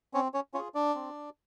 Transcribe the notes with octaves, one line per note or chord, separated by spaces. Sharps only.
C4 C#4 C#5
C#4 C#5
C#4 F4 G#4 C#5
D4 D5
C4